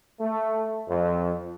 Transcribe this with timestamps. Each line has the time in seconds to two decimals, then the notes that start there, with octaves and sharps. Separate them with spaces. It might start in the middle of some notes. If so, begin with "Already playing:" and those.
0.20 A3
0.88 F2